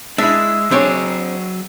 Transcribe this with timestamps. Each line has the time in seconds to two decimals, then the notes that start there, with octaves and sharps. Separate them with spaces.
0.18 G#3 D4 E4 E5
0.71 F#3 C4 D4 G#4 C#5